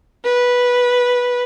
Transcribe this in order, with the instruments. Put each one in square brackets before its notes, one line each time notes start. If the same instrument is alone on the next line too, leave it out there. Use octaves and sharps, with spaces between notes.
[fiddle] B4